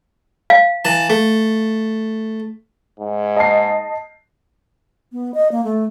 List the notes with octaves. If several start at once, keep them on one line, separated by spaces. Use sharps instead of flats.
F5
E3 A5
A3
G#2
D#5 A5 C7
B3
D#5
A#3
A3